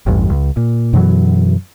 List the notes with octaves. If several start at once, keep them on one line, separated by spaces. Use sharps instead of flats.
A1 E2 G2
C#2
A#2
F#2 B2 E3 F#3